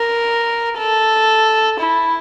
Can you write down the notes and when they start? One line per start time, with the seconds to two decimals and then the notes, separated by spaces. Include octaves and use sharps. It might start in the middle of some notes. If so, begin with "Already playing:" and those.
Already playing: A#4
0.79 A4
1.80 E4